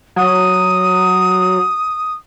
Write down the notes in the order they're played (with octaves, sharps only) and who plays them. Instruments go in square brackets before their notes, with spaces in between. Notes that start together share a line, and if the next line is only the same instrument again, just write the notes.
[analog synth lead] F#3 [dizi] D#6